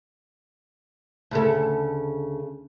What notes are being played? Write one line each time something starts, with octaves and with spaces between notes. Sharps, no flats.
D2 C#3 A4